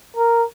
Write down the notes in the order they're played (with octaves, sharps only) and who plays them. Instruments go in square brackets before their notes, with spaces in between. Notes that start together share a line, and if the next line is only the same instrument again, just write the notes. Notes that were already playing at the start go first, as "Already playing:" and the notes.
[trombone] A#4